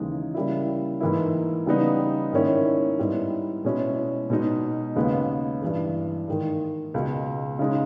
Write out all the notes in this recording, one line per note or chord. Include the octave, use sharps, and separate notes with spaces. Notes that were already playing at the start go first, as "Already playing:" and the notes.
Already playing: D#2 C#3 E3 G#3 D#4
C#3 G3 A#3 E4
G#2 E3 A#3 E4
C#3 G3 B3 D#4
G#2 D#3 A#3 C#4 E4
G#2 G3 B3 E4
B2 G#3 C#4 E4
B2 G#3 D#4
D#2 C#3 G#3 B3
G2 E3 G#3
G#2 D#3 G#3
C#2 B2 G#3
C#3 G#3 D#4